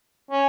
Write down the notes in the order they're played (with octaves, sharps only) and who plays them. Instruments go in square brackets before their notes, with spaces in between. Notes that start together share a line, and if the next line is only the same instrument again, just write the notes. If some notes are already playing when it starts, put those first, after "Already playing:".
[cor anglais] C#4